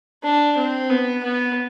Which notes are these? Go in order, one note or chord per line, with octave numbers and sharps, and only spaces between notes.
D4
C4
B3
B3